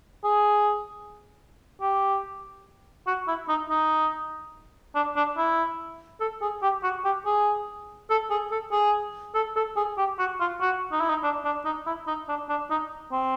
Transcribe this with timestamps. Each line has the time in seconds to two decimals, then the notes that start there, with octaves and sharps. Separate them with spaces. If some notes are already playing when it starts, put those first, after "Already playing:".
0.24 G#4
1.82 G4
3.07 F#4
3.28 E4
3.49 D#4
3.70 D#4
4.95 D4
5.16 D4
5.38 E4
6.20 A4
6.42 G#4
6.63 G4
6.83 F#4
7.05 G4
7.26 G#4
8.10 A4
8.30 G#4
8.51 A4
8.72 G#4
9.35 A4
9.56 A4
9.76 G#4
9.98 G4
10.19 F#4
10.40 F4
10.61 F#4
10.92 D#4
11.00 E4
11.09 D#4
11.23 D4
11.45 D4
11.65 D#4
11.86 E4
12.07 D#4
12.29 D4
12.49 D4
12.71 D#4
13.12 C4